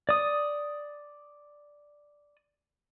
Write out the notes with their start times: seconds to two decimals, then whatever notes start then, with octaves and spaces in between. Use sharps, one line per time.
0.09 D5 D#6